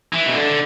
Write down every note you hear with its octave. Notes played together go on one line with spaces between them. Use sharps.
E3
B2
D3